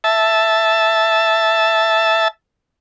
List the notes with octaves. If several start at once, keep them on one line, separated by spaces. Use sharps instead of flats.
E5 A5